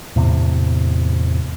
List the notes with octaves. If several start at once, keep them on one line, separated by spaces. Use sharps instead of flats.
E2 A2 C3